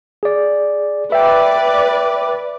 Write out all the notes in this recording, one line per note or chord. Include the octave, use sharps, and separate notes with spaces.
G#4 D5
B4 D5 E5 G5